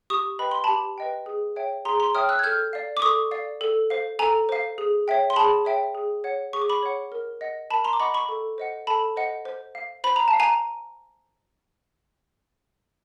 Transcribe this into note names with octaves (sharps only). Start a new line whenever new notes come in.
G4 C#6 D#6
B4 D#5 G5 B5
C6
G4 A5 B5
B4 D#5 G5
G#4
C#5 E5 G5
G#4 A#5 C6
A#5 C6
C#5 E5 G5 D#6 F6
E6 F#6
G#6
A4 F6 G6
D5 F5
D6
A4 C#6 D#6
D5 F5
A4
C5 F5
A4 G#5 A#5
C5 F5
G#4
C#5 E5 G5
C6
G#4 A5 B5
C#5 E5 G5
G#4
C#5 F#5
G#4 C#6
D6
B5 C#6
C#5 F#5
A#4
D#5 F#5
A#4 A5 B5
A#5 C6
D6
D#5 F#5 B5 C#6
B5 C#6
A4
C5 D#5 F#5
A4 A5 B5
C5 D#5 F#5
C5
F5
C5 B5
A#5
A5
F5
G#5 A#5